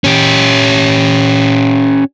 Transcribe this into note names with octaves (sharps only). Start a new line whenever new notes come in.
C#4 G4